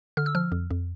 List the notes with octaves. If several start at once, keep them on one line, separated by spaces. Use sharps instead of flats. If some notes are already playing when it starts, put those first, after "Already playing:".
D3 F6
E6
F3 F6
F2
F2